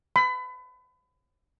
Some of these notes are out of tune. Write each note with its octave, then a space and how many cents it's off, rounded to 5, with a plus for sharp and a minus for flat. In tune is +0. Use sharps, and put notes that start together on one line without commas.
B5 +30